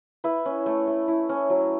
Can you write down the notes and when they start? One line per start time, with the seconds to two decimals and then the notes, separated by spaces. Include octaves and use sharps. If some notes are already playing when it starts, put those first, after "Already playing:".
0.24 E4 B4 E5
0.46 C#4
0.66 A3
0.87 A3
1.08 E4
1.29 C#4
1.50 F#3